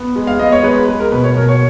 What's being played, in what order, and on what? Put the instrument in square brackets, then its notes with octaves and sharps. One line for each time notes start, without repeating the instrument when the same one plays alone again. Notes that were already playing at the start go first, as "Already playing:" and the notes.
Already playing: [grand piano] B3
G#3
F5
B3 D#5
C#5
G#3 B4
B4
G#3 B4
A#4
B2 B4
C#5
B2 A#4
C#5